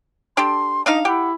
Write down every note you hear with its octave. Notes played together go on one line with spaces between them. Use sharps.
D4 G4 A4 C6
D4 D#4 D#5 F5
E4 G4 F#5